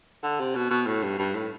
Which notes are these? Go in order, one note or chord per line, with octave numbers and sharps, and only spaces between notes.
D3
C3
B2
B2
A2
G2
G2
A2